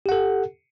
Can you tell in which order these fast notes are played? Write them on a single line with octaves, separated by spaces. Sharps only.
G4 F#5 A4